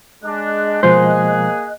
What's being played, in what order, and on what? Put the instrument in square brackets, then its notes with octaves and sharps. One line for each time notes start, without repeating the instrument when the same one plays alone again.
[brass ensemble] G#3 D4 [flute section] D#5 F#6
[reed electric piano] B2 F3 G#3 [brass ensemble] A#3 G#4 [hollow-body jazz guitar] C5